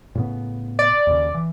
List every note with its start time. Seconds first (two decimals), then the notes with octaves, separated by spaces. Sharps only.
0.15 A2 C#3 B3
0.79 D5
1.07 D#2 C#3
1.34 E3